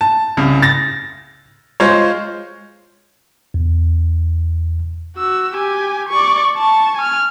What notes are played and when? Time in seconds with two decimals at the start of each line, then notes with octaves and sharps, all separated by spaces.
0.01 A5
0.37 C2 C#3
0.62 A6 A#6
1.80 G#3 F4 G#4 C5 C#5
3.54 E2
5.17 F#4 E6
5.54 G4 G#5
6.09 D5 C#6
6.57 A5 C#6
6.97 G#5 F6